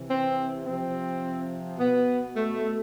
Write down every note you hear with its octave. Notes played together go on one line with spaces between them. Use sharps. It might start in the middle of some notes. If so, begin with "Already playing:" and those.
Already playing: C3 E3
C4
C3 F3 C4
B2 B3
A3